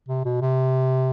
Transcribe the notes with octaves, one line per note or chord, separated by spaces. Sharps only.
C3
B2
C3